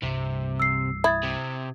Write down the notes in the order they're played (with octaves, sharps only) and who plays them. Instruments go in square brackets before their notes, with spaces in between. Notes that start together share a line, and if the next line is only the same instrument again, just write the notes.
[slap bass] C2 G2 G3 [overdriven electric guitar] C3
[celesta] E6 C7
[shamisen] E4 [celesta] D#6 G#6 A6
[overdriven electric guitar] C3